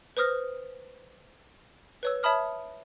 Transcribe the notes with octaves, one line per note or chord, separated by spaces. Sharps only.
B4 C5 D#6 F6 A#6
B4 C#5 E6
C#5 E5 A5 B5 D#6 F6